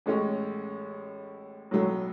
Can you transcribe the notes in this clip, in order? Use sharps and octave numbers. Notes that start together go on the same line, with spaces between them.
A1 A2 G#3 C#4
B1 A2 F#3 A3